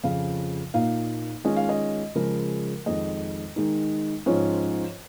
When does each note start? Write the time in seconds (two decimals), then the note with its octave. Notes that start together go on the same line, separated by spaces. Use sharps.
0.04 F2 C#3 F3 F5
0.74 A#2 A#3 D#4 F5
1.44 D#3 G#3 C#4 F4 D#5
1.56 F5
1.69 D#5
2.15 C#3 F3 G#3 A#4
2.86 F2 D#3 G#3 D#5
3.56 D#3 G#3 D#4
4.26 G#2 F3 C#4 F4 C#5